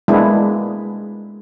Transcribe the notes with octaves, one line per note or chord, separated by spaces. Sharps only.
G#3 A#3 B3 D4 E4